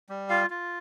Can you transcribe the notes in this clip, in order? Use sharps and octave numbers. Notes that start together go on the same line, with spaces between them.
G3
F4 F5
F4